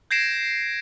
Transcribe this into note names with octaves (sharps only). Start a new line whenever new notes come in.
G6 G#6 A#6 C7 D7 E7